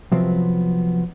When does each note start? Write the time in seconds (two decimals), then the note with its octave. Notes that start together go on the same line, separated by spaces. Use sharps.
0.12 C3 F3 F#3 B3 C4